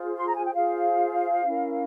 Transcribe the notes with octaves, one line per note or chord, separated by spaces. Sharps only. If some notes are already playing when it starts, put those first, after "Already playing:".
Already playing: F4 G#4 C5
C6
A#5
G#5
G5
F4 G#4 C5 F5
C#4 E4 A#4